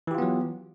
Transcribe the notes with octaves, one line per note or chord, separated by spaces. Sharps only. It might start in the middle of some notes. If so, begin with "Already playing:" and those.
E3 F#3 B3 F4 G4